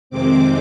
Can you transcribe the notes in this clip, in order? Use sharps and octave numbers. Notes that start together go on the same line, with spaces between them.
F2 C3 D#3 G#3 C4 D6